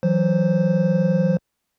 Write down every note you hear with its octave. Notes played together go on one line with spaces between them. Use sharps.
E3 F#3 C5